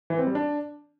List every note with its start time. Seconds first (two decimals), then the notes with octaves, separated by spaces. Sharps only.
0.10 E3
0.18 C4
0.27 G3
0.35 D4